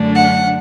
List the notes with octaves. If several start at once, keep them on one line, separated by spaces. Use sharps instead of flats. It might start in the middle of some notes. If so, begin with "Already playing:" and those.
Already playing: F#2 D3 A3 D4
F#5